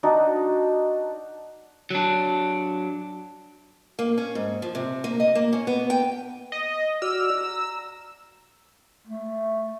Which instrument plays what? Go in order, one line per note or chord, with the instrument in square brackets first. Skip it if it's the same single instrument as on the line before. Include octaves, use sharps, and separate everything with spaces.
[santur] D4 D#4 F#4
[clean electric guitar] F#3 D4
[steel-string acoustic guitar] A#3
C#4
G#2
F3
C3
A#3
D#5
A#3
C#4
B3
G5
[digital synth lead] D#5
[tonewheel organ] F#4 D5 F6 [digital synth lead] E6
[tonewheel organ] A#5
[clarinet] A3